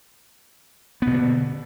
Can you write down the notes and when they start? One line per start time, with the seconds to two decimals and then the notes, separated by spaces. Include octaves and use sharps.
1.02 B3
1.07 B2
1.12 D3